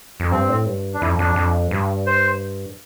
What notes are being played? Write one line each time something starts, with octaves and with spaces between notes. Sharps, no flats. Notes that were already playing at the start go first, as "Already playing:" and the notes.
F2
G2 C4
A2
G2
D4
F2 E4
F2 D4
F2
G2
C5